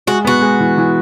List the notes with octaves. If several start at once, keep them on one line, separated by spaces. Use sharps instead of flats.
G#3 F#4
B3 F#4
G#3
E3
E3